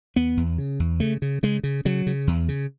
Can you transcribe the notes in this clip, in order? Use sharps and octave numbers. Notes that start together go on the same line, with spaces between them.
E2 B3
E2
C#3
E2
C#3 A3
C#3
C#3 G#3
C#3
C#3 F#3
C#3
E2
C#3